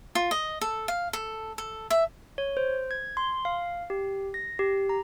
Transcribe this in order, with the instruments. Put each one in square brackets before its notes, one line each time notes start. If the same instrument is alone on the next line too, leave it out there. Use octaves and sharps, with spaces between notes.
[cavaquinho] F4
D#5
A4
F5
A4
A4
E5
[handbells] C#5
C5
G#6
C6
F5
G4
A#6
G4
A#5